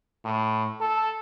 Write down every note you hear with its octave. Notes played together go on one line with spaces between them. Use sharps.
A2
A4